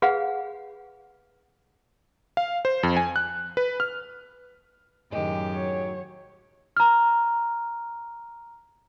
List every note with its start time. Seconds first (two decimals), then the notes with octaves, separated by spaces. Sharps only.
0.02 G#4 B4 F5 F#5
2.37 F5
2.65 C5
2.83 F2
2.97 G#5
3.16 F#6
3.57 B4
3.80 F6
5.12 F#2 A2 D#3 G#3 G4
5.52 F#3 C#5
6.77 A#5 F6